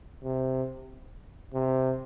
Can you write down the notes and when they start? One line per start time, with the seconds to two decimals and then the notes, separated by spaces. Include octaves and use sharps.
0.24 C3
1.54 C3